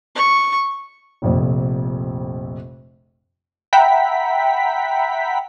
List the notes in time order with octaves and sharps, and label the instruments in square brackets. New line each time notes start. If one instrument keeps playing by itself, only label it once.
[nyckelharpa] C#6
[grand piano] F1 A#1 F2
[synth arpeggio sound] E5 F#5 G5 A#5 B5 B6